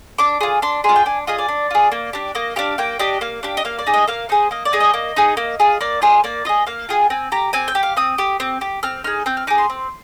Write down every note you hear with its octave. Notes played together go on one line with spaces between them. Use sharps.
D4 D6
F4 G#4
D4 C6
F4 G#4 C6
G5
D4 G#5
F4 G#4 D#5
D5
D4
F4 G#4
A#3
D4 G4
A#3 D#5
D4 G4 F5
A#3 G5
D4 G4 D#5
A#3 F5
D4 G4
D#5
A#3 F5
D5
D#4 G#4
D#5
A#3 F5
D#4 G#4 C5
A#3 D#5
D5
D#4 G#4
D#5
A#3
D#4 G#4
A#3
F4 G#4
A#3 D5
F4 G#4 C5
A#3 D5
F4 G#4 D#5
A#3 F5
F4 G#4 G5
C4 G#5
G4 A#5
C4 G#5
G5
G4
F5
C4 D#6
G4
C4
G4
C4 F6
D#4 G#4 F6
C4 G6
F6
D#4 G#4 D6
C6
C4